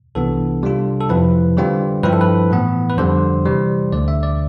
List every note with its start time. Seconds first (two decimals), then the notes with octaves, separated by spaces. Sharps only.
0.15 C2 C3 E3 B3 D4 A4
0.63 C3 G3 D4 F4
1.01 A4
1.09 F2 C3 F3 C4 E4 B4
1.57 D3 G3 C4 F4
2.03 G2 F3 C4 E4 B4
2.13 A4
2.21 B4
2.51 A2 E3 B3
2.90 B4
2.97 F2 D3 G3 C4 C5
3.45 C3 E3 G3
3.92 D2 D3 A3 D5
4.08 E5
4.23 D5